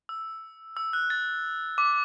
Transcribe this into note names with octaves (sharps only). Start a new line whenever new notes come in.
E6
E6
F#6
A6
D6